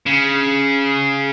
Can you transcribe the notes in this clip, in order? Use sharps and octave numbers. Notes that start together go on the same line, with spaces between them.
C#3